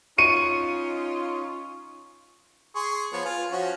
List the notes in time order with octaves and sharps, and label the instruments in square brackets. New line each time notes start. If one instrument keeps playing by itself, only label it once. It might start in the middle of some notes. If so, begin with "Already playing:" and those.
[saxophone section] C#4 D#4 F4 [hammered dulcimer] C#6 [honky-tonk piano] C#7 D#7
[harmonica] G#4 C6 C#6
F3 B3 C#5
F4 G#5
F3 C#4 F#4